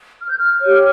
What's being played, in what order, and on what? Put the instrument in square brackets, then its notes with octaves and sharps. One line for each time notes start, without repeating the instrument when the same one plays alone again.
[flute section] F6
G6
F6
G4 C#5